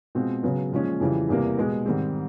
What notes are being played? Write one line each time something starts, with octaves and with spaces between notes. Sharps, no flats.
B2 G#3 C4 F4
C#3 F#3 B3
A#2 F3 G#3 C#4
F2 C#3 E3 G3
E2 C3 E3 G3 A#3
B2 G#3 B3
G#2 D#3 G3 C4